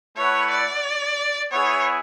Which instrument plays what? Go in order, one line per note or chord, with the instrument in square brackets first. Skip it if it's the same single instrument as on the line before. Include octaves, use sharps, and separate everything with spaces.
[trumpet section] A3 E4 B4 F#5 [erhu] C#5
[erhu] D5
[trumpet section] B3 E4 G#4 [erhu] C#5